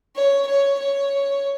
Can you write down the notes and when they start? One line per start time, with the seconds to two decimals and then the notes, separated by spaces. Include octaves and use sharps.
0.15 C#5
0.47 C#5
0.79 C#5